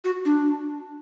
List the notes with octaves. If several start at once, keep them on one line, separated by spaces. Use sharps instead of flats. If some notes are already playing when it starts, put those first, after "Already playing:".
F#4
D4